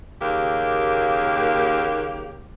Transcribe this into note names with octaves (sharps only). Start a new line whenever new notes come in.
D#2 C#3 A#3 G4